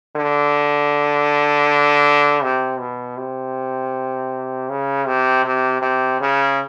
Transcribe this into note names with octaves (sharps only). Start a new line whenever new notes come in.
D3
C3
B2
C3
C#3
C3
C3
C3
C#3